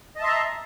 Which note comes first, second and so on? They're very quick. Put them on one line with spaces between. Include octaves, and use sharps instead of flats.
D#5 A5 E5 C6 A#5